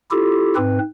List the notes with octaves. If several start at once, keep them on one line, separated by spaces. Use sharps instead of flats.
E4 F4 G4 A4
G#2 C4 B4